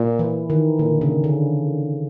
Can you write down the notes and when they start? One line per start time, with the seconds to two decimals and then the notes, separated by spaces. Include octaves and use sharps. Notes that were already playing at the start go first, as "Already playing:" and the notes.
Already playing: A#2
0.19 E3
0.50 D#3
0.79 A#2 D3
1.01 C#3
1.24 D3